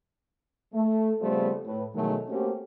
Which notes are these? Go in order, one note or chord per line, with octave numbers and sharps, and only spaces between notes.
A3
C#3 F3 G3 A3 B3 C4
A2 B4
B2 D#3 E3 F#3 G#3 A3
A3 A#3 C4 C#4 F#4 G4